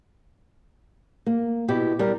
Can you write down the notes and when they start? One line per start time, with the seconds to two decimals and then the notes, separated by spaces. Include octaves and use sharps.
1.26 A#3
1.68 B2 E4 G4
1.99 G3 A#4